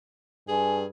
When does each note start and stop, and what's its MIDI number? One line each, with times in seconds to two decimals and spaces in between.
0.48 0.84 43
0.48 0.86 68
0.48 0.76 80